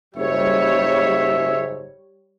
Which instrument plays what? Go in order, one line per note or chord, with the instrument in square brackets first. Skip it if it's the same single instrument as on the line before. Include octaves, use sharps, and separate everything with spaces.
[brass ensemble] F#1 G#2 [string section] G3 C#5 [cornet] E5